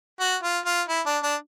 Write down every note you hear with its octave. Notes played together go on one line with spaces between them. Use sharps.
F#4
F4
F4
E4
D4
D4